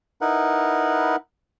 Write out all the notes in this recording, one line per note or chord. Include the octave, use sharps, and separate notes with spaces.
D#4 E4 A#4 B4 F#5